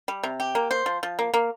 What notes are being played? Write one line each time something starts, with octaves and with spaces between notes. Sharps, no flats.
G3
C3
G4
A#3
C5
F3
F3
A#3
A#3